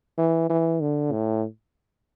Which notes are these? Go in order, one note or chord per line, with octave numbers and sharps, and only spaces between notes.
E3
E3
D3
A2